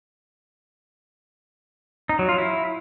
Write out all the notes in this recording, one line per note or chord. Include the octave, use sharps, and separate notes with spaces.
D#4
F#3
F4
E4